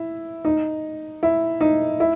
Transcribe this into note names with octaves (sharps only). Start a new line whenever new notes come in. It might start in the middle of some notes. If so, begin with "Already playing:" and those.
Already playing: E4
D#4
E4
D#4
E4